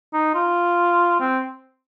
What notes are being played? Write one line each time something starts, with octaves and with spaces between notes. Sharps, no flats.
D#4
F4
C4